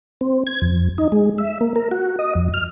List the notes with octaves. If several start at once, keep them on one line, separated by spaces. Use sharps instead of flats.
C4
G#6
F2
D#4
G#3
E5
A#3
A#4
F#4
D#5
F2
F6